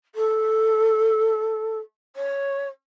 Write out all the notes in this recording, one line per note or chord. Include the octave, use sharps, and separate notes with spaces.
A4
C#5